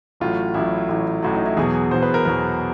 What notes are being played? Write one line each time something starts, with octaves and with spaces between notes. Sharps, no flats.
A1 A2 F#3 F4
A1 A2 F#3 E4
A1 A2 F#3
A1 A2 F#3
D#4
E4
E2 B2 F#3 G#4
E2 B2 F#3 C5
B4
A#4
E2 B2 F#3 A#4